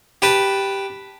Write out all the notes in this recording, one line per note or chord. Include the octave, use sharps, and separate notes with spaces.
G4 B4 A5